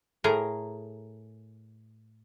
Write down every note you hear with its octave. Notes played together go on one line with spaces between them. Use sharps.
A2 G#4 A#4 A#5